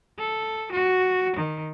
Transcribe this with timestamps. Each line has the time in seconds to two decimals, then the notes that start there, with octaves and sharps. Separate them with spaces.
0.19 A4
0.73 F#4
1.37 D#3